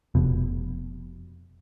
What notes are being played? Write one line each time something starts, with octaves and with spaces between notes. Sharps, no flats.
F1 B2